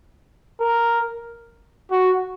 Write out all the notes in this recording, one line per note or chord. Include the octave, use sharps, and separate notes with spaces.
A#4
F#4